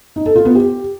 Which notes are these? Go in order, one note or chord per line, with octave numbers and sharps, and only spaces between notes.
D#4
A4
F4
B3
G4